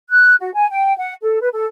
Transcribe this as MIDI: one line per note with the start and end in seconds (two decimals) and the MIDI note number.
0.10 0.35 90
0.40 0.52 66
0.53 0.67 80
0.69 0.96 79
0.97 1.14 78
1.22 1.40 69
1.41 1.48 71
1.53 1.64 69